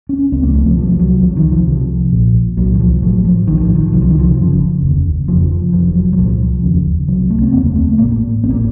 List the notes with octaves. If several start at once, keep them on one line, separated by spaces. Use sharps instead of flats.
C#4
C#2 C3 C4
A#3
F#3
A3
F3
C2 C3 F3
F3
F#3
C2 C3 F3
D#3
F3
C2 C3
A#1 A#2
C2 A#2 F#3
D#3
F3
A1 A2 F#3
F3
A#1 A2 D#3
F3
D#3
C2 C3 F#3
F3
D#3
F3
F#1 F#2 C#3
F1 D#2 C#3
F#1 F2 C#3 F3
F1 F2 C3 F3
F#3
F#3
C2 A#2 F3
F1 D#2 C#3
C2 C3 F#3
A3
C4
F1 D#2 C#3 A#3
A3
A1 A2 A#3
A1 A2 A#3 C4